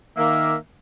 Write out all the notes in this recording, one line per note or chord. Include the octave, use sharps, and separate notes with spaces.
D#3 A#3 E5